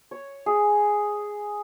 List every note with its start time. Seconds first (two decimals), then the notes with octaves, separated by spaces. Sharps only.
0.11 C#5
0.46 G#4